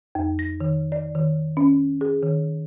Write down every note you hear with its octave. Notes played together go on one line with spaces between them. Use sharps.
F2
A#6
D#3
D5
D#3
C#4
G#4
D#3